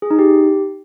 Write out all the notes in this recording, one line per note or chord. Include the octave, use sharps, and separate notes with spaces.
G#4
D#4
G4